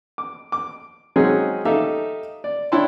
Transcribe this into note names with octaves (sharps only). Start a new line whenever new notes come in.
D6
D6
F#3 G#3 C4 C#4 D#4 G#4
D#4 G4 A4 E5 F5
D5
D4 E4 C#5 G5 A5 C6